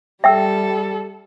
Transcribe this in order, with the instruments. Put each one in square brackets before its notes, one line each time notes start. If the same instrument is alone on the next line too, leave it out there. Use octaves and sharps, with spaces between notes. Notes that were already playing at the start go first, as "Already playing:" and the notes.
[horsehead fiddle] G3 A4 [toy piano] E5 G5 E6